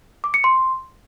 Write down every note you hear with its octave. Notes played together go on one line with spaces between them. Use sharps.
D6
C#7
C6